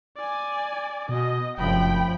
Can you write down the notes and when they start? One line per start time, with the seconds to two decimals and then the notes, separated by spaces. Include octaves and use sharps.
0.17 D5 G#5
1.09 B2 D#5
1.58 F1 F#2 F3 G5 B5